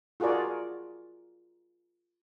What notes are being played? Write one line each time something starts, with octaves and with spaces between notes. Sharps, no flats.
F4 F#4 G#4 A#4 D5